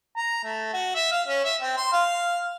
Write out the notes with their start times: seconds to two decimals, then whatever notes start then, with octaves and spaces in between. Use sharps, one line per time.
0.17 A#5
0.44 A3
0.73 F#4
0.95 E5
1.11 F5
1.27 C#4
1.45 E5
1.61 C4
1.77 C6
1.92 F5